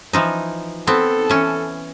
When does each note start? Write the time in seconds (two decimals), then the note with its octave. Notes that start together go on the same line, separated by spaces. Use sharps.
0.13 E3 F3 D#4
0.87 B3 C4 A4
1.30 E3 C#4